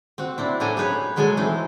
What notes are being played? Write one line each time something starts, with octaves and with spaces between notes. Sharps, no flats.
C4 F#4
C4 D4 E4
A2 F#3 G4 A4 G#5 A#5
D#4 G#4 B4 C#5
B2 F#3 G#3 G#4 A4 G#5
E3 A3 C4 D#4